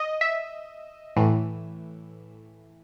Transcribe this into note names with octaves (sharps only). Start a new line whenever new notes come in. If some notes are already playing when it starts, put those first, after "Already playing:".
Already playing: D#5
E5
A2 E3